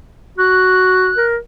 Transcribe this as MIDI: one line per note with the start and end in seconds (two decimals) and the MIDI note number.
0.38 1.12 66
0.38 1.26 90
1.17 1.38 70